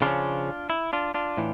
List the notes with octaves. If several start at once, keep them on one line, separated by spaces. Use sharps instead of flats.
C#3 F3 C#4 D4 F4
E4
D4 F4
D4 F4
A2 E3